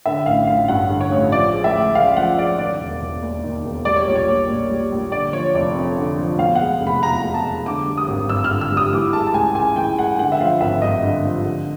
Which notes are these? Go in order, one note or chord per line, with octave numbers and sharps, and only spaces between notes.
D3 E5
A1 F5
A1 F5
G2 F#5
D3
C#5
A1
F3 D5
G#3
E5
D2
C#3 F5
F3 F#5
G#3 D5
D#3 D5
E1
E1
D#2
D#3
E1
G3 D5
C#5
A#1
C#5
A#1
A#2
G3
A#1
D3 D5
F3 C#5
F1 D5
F2
D3
F3
B2 F5
G#3 F#5
F1
B5
E2 A#5
B2
A5
G#3
D3 D6
G3
D#6
G#1
G2 E6
F6
D3
E6
G3
D#6
E3 D6
G#3 A5
A5
C#2 G#5
C#3 G#5
E3 G5
G#3 F#5
D3 F#5
E5
F3 F5
G#1 E5
G2 D#5
D3
F3
D3